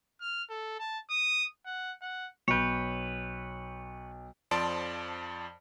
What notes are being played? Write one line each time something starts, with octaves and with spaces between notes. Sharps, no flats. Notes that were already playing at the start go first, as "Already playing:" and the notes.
F6
A4
A5
D#6
F#5
F#5
B1 B4 C#5 G6
F2 F3 D5 A5 C6 D7